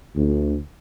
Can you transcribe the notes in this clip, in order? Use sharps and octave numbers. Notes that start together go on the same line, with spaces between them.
D2